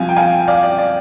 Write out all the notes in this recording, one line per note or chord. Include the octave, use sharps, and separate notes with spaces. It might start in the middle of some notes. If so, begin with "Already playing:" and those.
Already playing: C2 C3 F3 F5 G#5
G5
F5 G#5
D5 F5
D5
D5